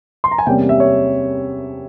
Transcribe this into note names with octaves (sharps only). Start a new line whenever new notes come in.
C6
A#5
G#5
E2 C3 G3 A#3 C#4 G5
E5
C#5